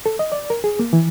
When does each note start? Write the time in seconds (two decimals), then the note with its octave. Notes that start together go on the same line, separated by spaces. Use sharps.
0.06 A4
0.19 D#5
0.32 D5
0.50 A#4
0.64 G#4
0.79 A#3
0.93 E3